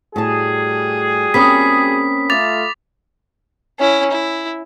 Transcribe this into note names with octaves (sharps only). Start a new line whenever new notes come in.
A2 G3 F#4 G#4 A5
A#3 C4 C#4 B5 D#6 B6
A3 F4 D6 A6 F7
C#4 E4
E4